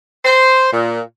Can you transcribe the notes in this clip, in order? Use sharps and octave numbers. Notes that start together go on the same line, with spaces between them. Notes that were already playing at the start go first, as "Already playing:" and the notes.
C5
A#2